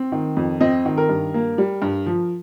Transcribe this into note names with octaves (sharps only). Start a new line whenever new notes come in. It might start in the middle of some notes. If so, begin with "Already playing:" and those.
Already playing: C4
D#3
F2
C4 D#5
D#3
A#4
G2
A#3
G3
G2
F3